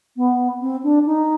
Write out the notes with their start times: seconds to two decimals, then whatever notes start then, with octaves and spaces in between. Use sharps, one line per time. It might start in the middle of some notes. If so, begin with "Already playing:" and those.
0.17 B3
0.61 C4
0.83 D4
1.06 D#4